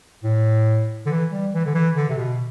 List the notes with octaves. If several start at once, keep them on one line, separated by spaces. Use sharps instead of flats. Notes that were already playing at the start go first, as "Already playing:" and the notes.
A2
D3
E3
G3
E3
D3
E3
D3
C3
B2